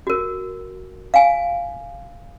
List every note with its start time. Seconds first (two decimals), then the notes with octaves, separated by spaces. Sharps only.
0.07 F#4 A#4
1.14 F5 G#5